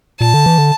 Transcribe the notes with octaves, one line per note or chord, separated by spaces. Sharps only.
A#2 A5
D3
E3
D3